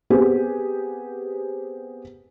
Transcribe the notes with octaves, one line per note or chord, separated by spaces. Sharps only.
B3 C4 G4 G#4